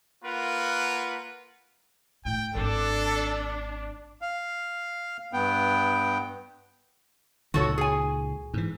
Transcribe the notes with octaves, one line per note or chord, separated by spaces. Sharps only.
A#3 F4 A#4 B4 F#5
A2 G5
G#1 D4 A4
F5
G2 B3 G5
C#2 A#2 D#3 F#4 A4 C#5
G#4 G#5
G#2 E3